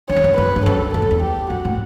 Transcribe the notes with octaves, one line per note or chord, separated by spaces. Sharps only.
F#2 C#5
E2
F#2
F#2 B4
G2
F#2 A4
E2 A4
F#2
E2
G4
F#2 F#4
A2